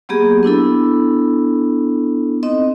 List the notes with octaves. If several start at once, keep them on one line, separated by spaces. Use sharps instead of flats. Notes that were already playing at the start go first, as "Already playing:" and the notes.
F#3 A#3 B3 G4 G#4
B3 D4 E4 A4
C4 D#4 D#5